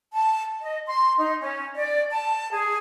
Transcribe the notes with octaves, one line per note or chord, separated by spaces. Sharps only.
A5
D#5
C6
D#4
C#4
D5
A5
G#4